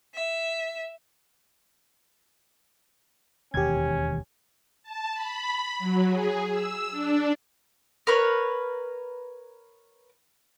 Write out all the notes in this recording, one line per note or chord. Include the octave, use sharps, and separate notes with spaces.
E5
E1 D#2 C#4 G4 G#6
A5
B5
F#3
G#4
E6
D4
A#4 B4 C#5